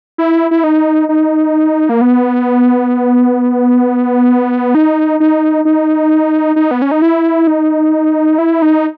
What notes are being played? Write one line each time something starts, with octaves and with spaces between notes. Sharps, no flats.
E4
E4
D#4
D#4
A#3
B3
D#4
D#4
D#4
D#4
B3
C#4
D#4
E4
D#4
E4
D#4